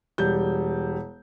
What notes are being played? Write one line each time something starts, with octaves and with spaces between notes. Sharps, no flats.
E1 G3 G6